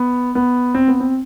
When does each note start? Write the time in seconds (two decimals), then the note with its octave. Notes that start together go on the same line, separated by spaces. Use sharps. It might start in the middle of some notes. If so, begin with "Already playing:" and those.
Already playing: B3
0.35 B3
0.75 C4
0.88 B3
1.00 C4